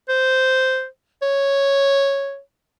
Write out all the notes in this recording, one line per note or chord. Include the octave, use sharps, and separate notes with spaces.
C5
C#5